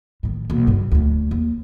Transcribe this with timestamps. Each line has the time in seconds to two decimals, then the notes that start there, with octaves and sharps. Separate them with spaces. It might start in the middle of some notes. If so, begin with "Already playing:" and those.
0.23 A2 D#3
0.50 B1 A#3
0.67 G2 C#3
0.91 D2 A3
1.31 D#2